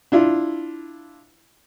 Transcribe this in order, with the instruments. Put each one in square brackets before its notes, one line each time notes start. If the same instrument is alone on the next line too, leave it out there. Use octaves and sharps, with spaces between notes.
[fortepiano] D4 E4 F4